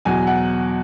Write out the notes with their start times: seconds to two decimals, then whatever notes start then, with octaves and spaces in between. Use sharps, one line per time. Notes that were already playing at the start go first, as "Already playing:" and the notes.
0.05 E2 B2 F#3 G#5
0.27 F#5